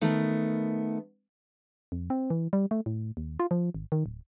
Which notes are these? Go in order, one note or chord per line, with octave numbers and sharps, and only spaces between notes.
D#3 A3 B3
F2
C4
E3
G3
A3
A2
D#2
F4
F3
G#1
D#3
D1